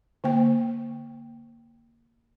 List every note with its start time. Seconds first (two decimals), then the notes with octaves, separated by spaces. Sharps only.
0.24 D3 A#3 G5